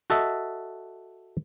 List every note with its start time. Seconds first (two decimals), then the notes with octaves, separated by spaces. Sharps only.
0.10 F#4 A4 D#5 E5